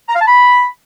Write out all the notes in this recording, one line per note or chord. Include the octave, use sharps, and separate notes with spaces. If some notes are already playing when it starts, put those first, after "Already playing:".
A#5
F5
A5
B5